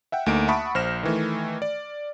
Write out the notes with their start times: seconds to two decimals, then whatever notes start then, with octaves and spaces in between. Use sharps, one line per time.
0.12 E5 F#5 G5
0.26 D2 A3 A#3 D#4 D7
0.48 E5 F#5 A5 B5 C#6 D#6
0.75 A#1 C5 F6 A#6 E7
1.03 D#3 E3 A3
1.62 D5